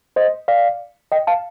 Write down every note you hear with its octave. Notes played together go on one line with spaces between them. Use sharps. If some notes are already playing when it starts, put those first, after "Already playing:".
C5 D#5
D5 F5
D#5 G5
F5 A5